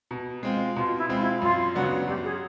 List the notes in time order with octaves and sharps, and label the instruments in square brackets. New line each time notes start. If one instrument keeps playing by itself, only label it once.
[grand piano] B2
G#3 C4 F4
[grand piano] B2 [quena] F4
[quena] E4
[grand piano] G#3 C4 F4
[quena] E4
[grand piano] F#2 [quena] F4
[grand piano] C#3 F#3 B3 D4 [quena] F#4
[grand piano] F#2 [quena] G4
[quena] G#4